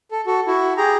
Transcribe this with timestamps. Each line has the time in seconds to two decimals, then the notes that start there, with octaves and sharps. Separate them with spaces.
0.11 A4
0.26 F#4 A4
0.47 E4 F#4
0.77 G4 G#4 A#5